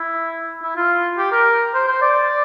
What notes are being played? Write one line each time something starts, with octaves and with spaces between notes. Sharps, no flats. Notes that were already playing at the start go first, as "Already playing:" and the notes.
Already playing: E4
E4
F4
G4
A#4
C5
C5
D5